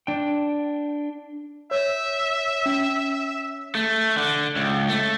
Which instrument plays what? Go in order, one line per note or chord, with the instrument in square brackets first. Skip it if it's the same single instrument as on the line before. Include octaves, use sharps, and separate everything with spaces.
[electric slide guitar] D4 G5
[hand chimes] C#5 [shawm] E5
[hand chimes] C#4
[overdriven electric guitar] A3
D3
C#2
A3